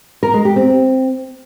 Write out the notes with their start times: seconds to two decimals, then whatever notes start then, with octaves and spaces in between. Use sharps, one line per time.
0.23 A#4
0.34 G#3
0.45 G4
0.56 C4